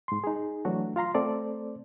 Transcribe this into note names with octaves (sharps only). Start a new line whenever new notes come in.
G#2 C6
D#4 G#4
E3 F#3 A3 D4 F#4
F4 F5 A#5 C6
A3 C4 A4 C5 D5